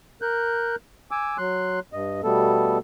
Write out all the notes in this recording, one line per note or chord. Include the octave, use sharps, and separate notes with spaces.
A#4 F#6 G6
G#5 D6 E6
F#3 C6 F#6
G2 D#5
B2 G3 A3 B3 A4